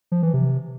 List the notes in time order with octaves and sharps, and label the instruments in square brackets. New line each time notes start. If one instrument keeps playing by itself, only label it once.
[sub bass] F3
E3
C3